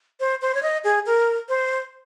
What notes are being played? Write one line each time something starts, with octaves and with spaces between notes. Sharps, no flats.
C5
C5
C#5
D#5
G#4
A#4
C5